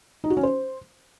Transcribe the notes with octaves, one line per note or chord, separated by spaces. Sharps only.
D#4
F#4
C#4
C5